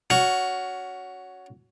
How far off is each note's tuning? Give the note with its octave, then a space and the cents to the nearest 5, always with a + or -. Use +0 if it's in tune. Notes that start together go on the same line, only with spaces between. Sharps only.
C#4 +15 F#4 +0